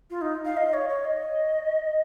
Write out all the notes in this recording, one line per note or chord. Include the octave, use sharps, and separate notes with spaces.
F4
D#4
F5
D#5
C#5
C#5
D#5